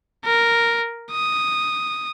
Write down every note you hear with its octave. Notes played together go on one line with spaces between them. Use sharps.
A#4
D#6